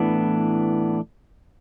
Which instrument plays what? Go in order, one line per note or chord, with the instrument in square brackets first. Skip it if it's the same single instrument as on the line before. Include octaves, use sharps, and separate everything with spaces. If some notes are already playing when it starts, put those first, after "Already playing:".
Already playing: [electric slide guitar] A2 E3 B3 D4